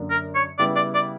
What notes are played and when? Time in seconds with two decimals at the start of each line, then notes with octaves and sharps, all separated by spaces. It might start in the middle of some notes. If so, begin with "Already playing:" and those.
Already playing: F#2 D3 A#3 D4
0.10 A#4
0.35 C#5
0.59 C#3 G3 B3 E4 D5
0.76 D5
0.94 D5